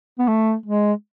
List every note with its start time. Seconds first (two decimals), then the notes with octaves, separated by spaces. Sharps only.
0.19 B3
0.28 A3
0.66 G#3